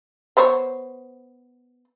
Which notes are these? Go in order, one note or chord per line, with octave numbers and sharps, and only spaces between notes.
B3 C5 C#5